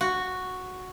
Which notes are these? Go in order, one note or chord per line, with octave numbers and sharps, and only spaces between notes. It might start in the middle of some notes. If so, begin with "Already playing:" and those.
F#4